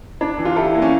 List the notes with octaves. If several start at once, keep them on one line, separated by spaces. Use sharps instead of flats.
D4
E3
F4
E4 G4 A4
A#3
C#4